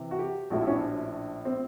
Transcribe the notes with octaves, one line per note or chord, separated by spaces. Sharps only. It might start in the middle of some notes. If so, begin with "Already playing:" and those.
Already playing: C3 E3
F#4
G4
A#1 A2 F3 F#4
E4
C#4
D4
C4